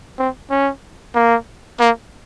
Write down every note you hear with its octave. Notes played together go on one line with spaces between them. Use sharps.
C4
C#4
A#3
A#3